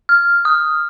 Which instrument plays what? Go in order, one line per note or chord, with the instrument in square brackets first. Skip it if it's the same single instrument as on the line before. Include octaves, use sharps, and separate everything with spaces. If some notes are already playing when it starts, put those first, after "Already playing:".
[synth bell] F6
D#6